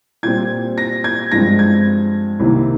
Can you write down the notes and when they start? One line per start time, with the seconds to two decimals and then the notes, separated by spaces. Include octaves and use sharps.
0.23 A#2 G3 C4 G#6
0.78 A#6
1.04 G#6
1.32 G2 F3 G#3 C4 A#6
1.59 G#6
2.40 C2 C3 D#3 A#3